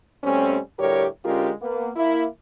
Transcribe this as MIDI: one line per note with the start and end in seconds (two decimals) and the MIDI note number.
0.24 0.58 47
0.24 0.58 55
0.24 0.58 57
0.24 0.58 60
0.24 0.58 61
0.80 1.07 38
0.80 1.07 45
0.80 1.07 55
0.80 1.07 67
0.80 1.07 70
0.80 1.07 73
1.25 1.52 50
1.25 1.52 56
1.25 1.52 61
1.25 1.52 65
1.25 1.52 67
1.25 1.52 70
1.62 1.91 58
1.62 1.91 59
1.96 2.27 58
1.96 2.27 64